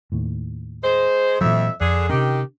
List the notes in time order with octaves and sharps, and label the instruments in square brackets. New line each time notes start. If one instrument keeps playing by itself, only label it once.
[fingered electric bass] D#2 A2
[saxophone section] G#3 C5
[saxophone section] F2 E5 [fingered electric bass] A#2 E3 F#3
[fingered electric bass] F2 [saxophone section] D3 G#4
[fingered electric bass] C3 C#4 D4 [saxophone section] D#3 G4